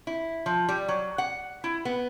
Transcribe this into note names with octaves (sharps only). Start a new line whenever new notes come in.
E4
F3
G3
F#3
F#5
E4
B3